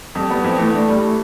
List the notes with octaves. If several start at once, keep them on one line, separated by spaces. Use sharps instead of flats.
F2 G3
G3 B3
F2 F3
E3 A3
A3 D4
G3